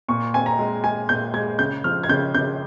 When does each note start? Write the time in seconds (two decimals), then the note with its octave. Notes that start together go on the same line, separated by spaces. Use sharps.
0.08 A#2 C#6
0.34 C4 G#5
0.46 A#5
0.59 G#3
0.84 G#3 G#5
1.09 A#2 G6
1.34 G#3 G#6
1.59 C#3 G6
1.84 F3 F6
2.03 G#6
2.09 C#3 G6
2.34 C#3 G6